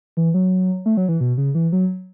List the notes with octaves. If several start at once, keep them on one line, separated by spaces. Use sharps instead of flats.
E3
F#3
A3
F#3
E3
B2
C#3
E3
F#3